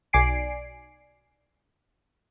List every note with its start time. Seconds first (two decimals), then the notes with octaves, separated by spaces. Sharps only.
0.13 B1 D5 G#5 C7 D7